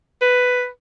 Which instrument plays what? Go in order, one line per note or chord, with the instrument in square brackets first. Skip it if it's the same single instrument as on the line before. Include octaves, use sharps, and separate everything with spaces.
[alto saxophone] B4